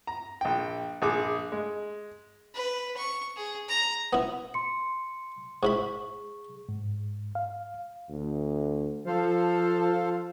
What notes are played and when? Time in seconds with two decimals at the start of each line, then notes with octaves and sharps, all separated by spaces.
0.07 A#5
0.41 A#1 G5
1.02 A#1 G#4 D6
1.52 G#3
2.55 B4
2.97 C#6
3.36 G#4
3.69 A#5
4.13 B3 E4
4.54 C6 C#7
5.63 G#2 E4 G#4 B5 C#6
6.69 G#2
7.35 F5
8.10 D2
9.07 F3 A4 C5 F5